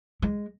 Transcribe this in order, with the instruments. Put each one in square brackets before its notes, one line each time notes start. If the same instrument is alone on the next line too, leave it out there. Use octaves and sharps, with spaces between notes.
[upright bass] G#3